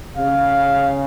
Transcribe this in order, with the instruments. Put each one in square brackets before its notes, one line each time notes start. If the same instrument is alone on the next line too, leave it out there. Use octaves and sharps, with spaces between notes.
[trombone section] C#3 [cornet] F5